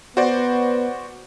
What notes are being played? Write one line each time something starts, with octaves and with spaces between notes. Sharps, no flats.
B3 F#4 C5 D5